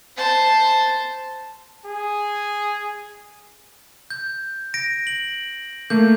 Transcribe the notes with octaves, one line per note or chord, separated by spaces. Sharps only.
C5 A5
G#4
G6
A#6 D7
F#7
A3 A#3 G6